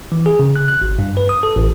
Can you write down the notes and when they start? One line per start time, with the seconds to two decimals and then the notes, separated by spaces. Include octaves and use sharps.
0.12 E3
0.26 G#4
0.39 C#3
0.56 F#6
0.68 F#6
0.81 G#1
0.99 G2
1.17 B4
1.29 D#6
1.43 A4
1.56 A1